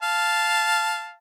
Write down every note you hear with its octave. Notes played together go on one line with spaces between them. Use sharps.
F5 A5